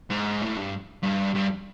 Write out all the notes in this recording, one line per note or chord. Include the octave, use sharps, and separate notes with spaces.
G#2
A2
G2
G2
G2